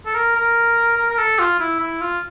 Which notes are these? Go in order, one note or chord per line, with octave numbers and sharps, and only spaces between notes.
A4
A#4
A#4
A#4
A#4
A4
F4
E4
E4
F4